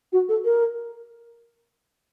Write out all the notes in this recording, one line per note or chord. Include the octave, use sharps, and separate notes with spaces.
F#4
A4
A#4